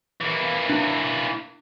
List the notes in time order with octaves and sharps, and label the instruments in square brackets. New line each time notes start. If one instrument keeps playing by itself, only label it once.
[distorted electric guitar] E3 A#3
[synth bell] D4